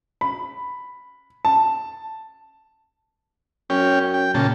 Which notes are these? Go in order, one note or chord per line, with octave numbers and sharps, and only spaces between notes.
B5
A5
F#2 C#4 G5
G5
A#2 C#3 A5